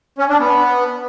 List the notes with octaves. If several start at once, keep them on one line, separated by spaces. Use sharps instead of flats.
C#4
D4
B3